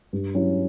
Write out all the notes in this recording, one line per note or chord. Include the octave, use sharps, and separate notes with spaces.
G2
F#3 C#4 E4